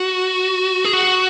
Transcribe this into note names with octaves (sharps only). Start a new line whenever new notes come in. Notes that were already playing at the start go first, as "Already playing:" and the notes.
Already playing: F#4
G#4
F#4